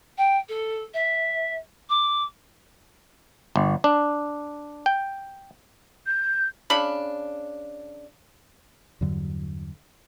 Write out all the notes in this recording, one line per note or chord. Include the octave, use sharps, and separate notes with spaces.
G5
A4
E5
D6
G1
D4
G5
G6
C#3 D4 B5
E2 G2 D3 F#3